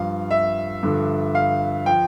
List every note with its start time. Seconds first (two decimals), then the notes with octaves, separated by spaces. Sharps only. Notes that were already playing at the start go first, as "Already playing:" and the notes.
Already playing: G2 F3 F5
0.31 E5
0.83 G2 D3 F3
1.35 F5
1.86 F3 G5